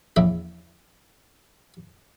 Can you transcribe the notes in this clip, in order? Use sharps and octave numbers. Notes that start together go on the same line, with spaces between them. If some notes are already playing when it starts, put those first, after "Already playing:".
A#1 E2 C#3 A#3 E5